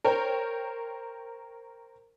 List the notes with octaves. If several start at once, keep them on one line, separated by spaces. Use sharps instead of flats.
A#4 C5 C#5 G5 A#5